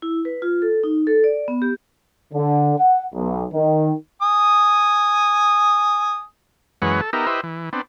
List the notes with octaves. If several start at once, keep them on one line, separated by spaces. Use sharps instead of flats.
E4
B4
F4
A4
D#4
A4
D5
B3
G4
D3
F#5
B1
D#3
G#5 D#6
F#2 E3 G#3 B4 C#5 F#5
A4
B3 D#4 G4 A#4 E5
E4 G4 B4 C5 D#5 E5
E3
B3 C4 D4